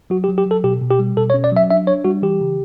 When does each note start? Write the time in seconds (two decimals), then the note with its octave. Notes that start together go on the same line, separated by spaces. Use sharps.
0.10 F#3 F#4
0.24 G4
0.29 F#3
0.38 G4
0.46 F#3 A4
0.64 B2 G4
0.81 B2
0.91 G4
0.99 G3
1.17 B2 A4
1.30 C#5
1.34 C#4
1.44 D5
1.52 F#3 E5
1.70 D4 E5
1.87 D4 C#5
2.05 G3 F#4
2.22 E3 G4
2.41 C#3